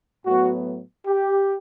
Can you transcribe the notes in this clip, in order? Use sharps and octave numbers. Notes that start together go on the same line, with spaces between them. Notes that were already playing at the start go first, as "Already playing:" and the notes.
A2 F#3 B3 F#4
G4